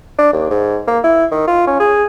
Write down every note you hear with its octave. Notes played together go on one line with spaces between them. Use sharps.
D4
D#2
G#2
A#3
E4
D#3
F4
C#4
G#4